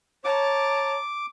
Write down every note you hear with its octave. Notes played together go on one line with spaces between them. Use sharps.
C#5 A5 A#5 D6